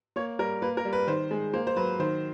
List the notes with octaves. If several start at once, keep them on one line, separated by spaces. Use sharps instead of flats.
A#3 C#5
G3 A#4
A#3 B4
A#4
G3
B4
D#3 C5
G#3
A#3 C5
C5
F#3 B4
D#3 C5